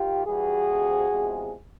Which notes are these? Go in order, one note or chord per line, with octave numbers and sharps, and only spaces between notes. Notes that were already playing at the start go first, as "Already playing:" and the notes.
Already playing: D#3 F4 G4
G2 E3 G3 F#4 G#4
D2 C3 F3
E2 C3 F3 G#3